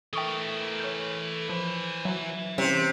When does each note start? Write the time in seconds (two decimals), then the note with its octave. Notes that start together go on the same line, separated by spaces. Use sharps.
0.13 E3 A4 A#4 E5 G5 C#6 D#6
0.80 C#5 G6
1.49 F3 C5 C#5
2.05 F#3 E5 G#5
2.58 C3 E3 G3 C4 C#4 G#4